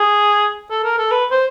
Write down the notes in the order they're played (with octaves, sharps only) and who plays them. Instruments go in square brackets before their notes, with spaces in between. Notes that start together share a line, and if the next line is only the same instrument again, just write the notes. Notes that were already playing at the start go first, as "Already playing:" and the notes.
Already playing: [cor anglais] G#4
A4
A#4
A4
B4
C5